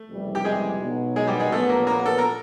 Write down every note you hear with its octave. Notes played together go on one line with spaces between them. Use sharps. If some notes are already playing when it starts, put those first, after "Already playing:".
Already playing: A3
F#1 F2 C3 E3 G3
G4
G#3 G#4
B1 B2 F#3
G#3 G#4
G3 G4
G#3 G#4
A#1 A#2 F#3 A3 B3 A4
A#3 A#4
A#3 A#4
A4
A#4